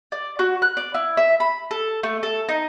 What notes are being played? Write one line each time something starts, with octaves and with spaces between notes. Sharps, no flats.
D5
F#4
F#6
D5
E4
E5
B5
A4
A3
A4
D#4